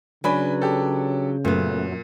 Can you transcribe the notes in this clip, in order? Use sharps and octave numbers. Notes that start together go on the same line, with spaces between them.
C#3 F#3 D4 B4 G#5 B5
G4 A4
F#2 A#2 A3 B3